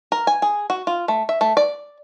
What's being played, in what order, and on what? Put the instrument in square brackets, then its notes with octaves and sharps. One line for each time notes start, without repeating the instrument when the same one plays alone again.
[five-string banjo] A#4
G#5
G#4
F#4
F4
A3
E5
A3
D5